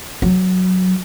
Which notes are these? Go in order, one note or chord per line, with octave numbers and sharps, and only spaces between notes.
F#3